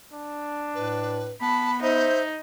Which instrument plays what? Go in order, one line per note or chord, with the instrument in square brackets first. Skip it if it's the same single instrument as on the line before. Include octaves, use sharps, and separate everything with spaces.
[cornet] D4
[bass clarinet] A2 [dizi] B4
[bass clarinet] B3 [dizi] A5 [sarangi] B5
[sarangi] D#4 [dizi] C5 [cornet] E5